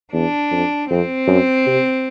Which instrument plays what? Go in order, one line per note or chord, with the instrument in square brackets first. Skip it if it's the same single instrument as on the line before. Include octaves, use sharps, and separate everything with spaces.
[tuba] E2 [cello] D4
[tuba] F2
[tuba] F2 [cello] C4
[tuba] F#2
C3